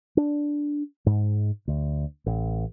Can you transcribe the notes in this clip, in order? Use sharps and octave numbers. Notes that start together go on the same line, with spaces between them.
D4
G#2
D2
A1